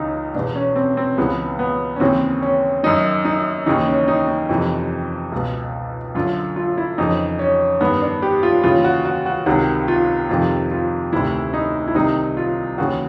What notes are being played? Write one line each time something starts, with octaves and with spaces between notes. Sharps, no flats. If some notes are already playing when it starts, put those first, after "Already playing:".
Already playing: C#2 C#3 E3 D#4
E2 B2 D4
C#4
C4
C4
C#2 C#3 E3 B3
B3
C#4
D#2 C#3 E3 C4
C#4
F#2 D#3 D#4
D#4
D#2 C#3 E3 D#4
C#4
D#4
D#4
F2 C3 E3
C#2 B2
F#2 D3 F4
F4
E4
F2 C#3 E3 D#4
C#4
G2 D#3 B3
D4
G4
F4
D#2 C#3 E3 F4
F#4
F#4
F#4
C#2 C3 D#3 F#4
F4
F2 C3 D#3 F4
F4
D2 C3 D#3 E4
D#4
E4
C2 C3 D#3 D#4
F4
D#2 C#3 E3 F#4